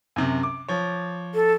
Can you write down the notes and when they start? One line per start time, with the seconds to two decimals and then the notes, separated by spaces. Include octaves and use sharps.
0.16 F#2 C3
0.43 D6
0.68 F3 C#5
1.35 A4